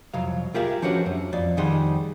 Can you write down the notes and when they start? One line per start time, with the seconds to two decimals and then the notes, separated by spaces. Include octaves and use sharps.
0.14 C2 F2 F#3 F5
0.54 F4 G4 G#4 A#4 E5 F5
0.82 F3 C#4 D4 F#4 G4 B4
1.06 F#2
1.33 F2 D5
1.57 F2 D#3 G3 G#4 F#5 C6